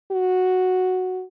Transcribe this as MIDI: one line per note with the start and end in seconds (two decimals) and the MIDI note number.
0.12 1.24 66